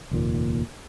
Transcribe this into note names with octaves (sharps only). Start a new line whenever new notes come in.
F1 D#2 A#2